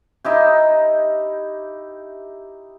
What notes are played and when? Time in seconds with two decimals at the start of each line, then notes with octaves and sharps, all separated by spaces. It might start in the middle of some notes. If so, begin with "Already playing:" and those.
0.24 D#4 E4 G4